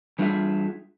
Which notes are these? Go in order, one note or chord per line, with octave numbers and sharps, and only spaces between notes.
E2 G3 D4 F4 G#4 E5